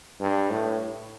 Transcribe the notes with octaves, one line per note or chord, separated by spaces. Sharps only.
G2
A2